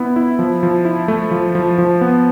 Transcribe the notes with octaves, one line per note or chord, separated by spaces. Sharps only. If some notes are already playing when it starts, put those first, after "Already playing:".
Already playing: B3 E4
E4
F3
F3
E4
A3
F3
F3
F3
B3